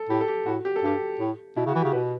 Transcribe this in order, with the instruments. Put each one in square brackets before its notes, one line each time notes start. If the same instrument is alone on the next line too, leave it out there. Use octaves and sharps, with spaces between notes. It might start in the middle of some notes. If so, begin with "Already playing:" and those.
Already playing: [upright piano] A4
[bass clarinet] A2 [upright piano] G4
[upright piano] A4
G4
[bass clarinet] A2 [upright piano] F#4
[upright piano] G4
A4
[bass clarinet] G2 [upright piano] G4
[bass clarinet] A2
[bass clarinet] B2 [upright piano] E4
[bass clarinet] C#3
[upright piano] F#4
[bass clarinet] E3
[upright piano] G4
[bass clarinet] C#3
[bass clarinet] B2 [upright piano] B4